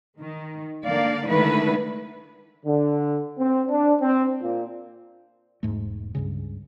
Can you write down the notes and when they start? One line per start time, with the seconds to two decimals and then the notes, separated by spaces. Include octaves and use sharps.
0.20 D#3
0.85 D3 A#3 D5 F5
1.28 D3 D#3 G#3 A3 E4 B4
2.64 D3
3.38 C4
3.68 D4
3.99 C4
4.40 A#2
5.63 E1 G#2 A3
6.15 C#2 G2 C#3